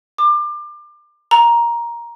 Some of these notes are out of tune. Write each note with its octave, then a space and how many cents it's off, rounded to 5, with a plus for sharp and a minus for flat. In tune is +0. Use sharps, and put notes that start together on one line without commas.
D6 +30
A#5 +10